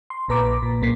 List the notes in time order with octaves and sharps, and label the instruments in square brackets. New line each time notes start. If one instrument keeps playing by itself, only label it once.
[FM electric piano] C6
A#1 A#2 B4 A#5 D6
A#2
B1 A#2 A#3 B6 C7